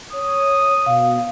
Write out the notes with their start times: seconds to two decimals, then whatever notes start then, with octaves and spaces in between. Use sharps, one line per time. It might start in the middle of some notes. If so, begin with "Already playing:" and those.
0.12 C#5 D#6
0.86 B2 F5